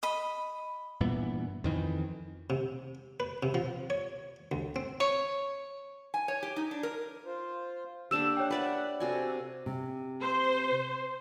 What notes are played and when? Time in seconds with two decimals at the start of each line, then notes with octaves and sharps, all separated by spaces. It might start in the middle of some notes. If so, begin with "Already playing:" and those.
0.03 D#5 B5
1.01 G2 A#2 E3 B3
1.64 F2 D#3 E3
2.50 C3
3.20 B4
3.43 C3
3.54 F3
3.90 C#5
4.52 D2
4.76 C4
5.00 C#5
6.14 G#5
6.28 C#5
6.43 G4
6.56 D#4
6.71 D4
6.83 A#4
7.25 F4 C5
8.11 D3 A#3 D4 G4 A4 E6 E7
8.37 C#5 F#5 G5
8.51 B4 D5 E5
9.00 C3 F#4 A4 D5 G#5
9.66 C3
10.21 C5